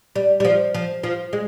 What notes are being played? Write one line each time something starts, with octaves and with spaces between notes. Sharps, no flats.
G3
G3
F3
F3
F3
G#3